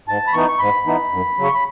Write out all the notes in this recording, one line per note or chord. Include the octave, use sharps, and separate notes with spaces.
G#2 A5
B5
E3 B3 D#4 C#6
C#6
G#2 B5
E3 B3 D#4
F#2
C#3 F#3
C#6
B5